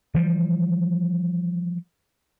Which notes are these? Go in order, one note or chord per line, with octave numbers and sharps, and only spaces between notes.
E3 F3 G3